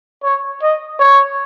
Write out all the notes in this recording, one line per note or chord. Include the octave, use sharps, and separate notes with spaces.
C#5
D#5
C#5